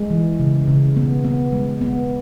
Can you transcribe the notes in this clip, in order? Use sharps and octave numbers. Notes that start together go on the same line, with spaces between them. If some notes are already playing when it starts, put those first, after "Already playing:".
Already playing: G#3
E3
C#3
C#3
B3
B3
G#3
B3